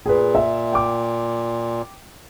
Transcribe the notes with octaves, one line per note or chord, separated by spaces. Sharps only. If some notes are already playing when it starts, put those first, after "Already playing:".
A#2 G#4 B4
E5
G5 D6